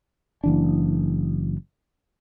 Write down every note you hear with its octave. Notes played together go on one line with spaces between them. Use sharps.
F#1 E3 D4